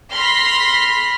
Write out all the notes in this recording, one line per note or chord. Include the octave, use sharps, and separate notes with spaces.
B5 C6 F6 A#6 B6